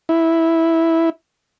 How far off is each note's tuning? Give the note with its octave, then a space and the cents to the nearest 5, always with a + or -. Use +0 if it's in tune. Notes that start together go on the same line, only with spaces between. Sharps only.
E4 -5